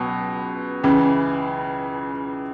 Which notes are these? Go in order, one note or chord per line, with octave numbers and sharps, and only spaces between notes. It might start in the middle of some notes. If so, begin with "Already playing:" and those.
Already playing: C#2 B2 F#3 B3
C#2 C#3 E3